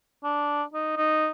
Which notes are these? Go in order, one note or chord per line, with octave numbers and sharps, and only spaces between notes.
D4
D#4
D#4